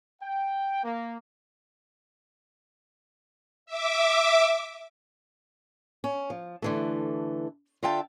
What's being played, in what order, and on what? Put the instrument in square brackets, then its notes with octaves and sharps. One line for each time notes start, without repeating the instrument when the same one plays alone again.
[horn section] G5
A#3
[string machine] E5 D6
[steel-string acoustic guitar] C#4
F3
D3 E3 A3
D3 F4 E5 G5 A5